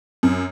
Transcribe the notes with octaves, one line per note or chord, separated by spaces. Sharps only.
F#2